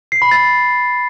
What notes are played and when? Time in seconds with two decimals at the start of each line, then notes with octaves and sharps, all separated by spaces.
0.12 C7
0.22 B5
0.31 A6